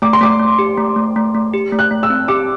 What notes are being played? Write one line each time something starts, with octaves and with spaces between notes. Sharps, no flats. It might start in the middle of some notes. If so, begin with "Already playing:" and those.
A3 D6
C6
A3 D6
A3
G4
A3
A3
A3
A3
G4
A3
F#6
A3
E6
C4
G4 D6